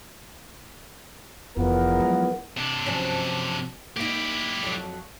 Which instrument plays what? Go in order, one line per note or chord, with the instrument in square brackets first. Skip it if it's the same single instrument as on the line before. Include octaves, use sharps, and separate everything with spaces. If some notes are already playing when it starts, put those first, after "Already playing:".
[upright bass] F1 [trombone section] E2 F3 B3 [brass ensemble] A#4
[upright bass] F#3 G#3
[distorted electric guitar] C3 D4
[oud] F3 F#3 C#4
[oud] A#3 D#4 [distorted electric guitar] E4 G4
[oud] F2 F#3